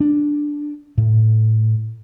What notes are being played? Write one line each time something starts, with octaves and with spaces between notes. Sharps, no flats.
D4
A2